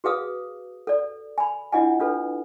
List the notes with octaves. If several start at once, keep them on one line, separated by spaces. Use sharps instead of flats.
F#4 G#4 B4 F5 D#6
A4 D5
G#5 B5
D4 E4 F4 D#5 F#5 G#5
D4 F4 A4 B4